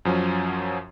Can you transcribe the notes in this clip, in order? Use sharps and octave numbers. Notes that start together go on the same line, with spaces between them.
F#2 F3 F#3 C#4